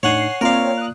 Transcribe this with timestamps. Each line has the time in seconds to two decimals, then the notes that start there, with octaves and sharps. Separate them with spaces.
0.03 A2 D4 D#4 C#5 F#5 G#5 C7
0.41 A#3 C4 F4 A#4 C#5 D5 F5
0.77 D#6 F#6